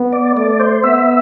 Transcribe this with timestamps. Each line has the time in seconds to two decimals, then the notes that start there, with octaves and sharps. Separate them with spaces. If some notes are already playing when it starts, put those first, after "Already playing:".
Already playing: B3
0.13 D5
0.36 A3 D5
0.60 C5
0.84 B3 E5